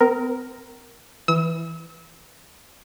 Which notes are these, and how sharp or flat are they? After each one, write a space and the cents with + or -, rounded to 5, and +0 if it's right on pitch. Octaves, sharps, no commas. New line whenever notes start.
C4 -45 A#4 +0
E3 +0 E6 -35